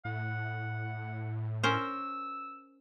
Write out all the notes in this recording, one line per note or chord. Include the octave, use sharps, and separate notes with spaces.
A2 F#5
C#4 A#4 C5 E6